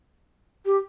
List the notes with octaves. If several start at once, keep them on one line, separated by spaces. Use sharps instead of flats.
G4